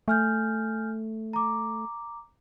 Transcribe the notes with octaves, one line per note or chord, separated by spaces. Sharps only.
A3 G#5 F6 G6
A#5 D6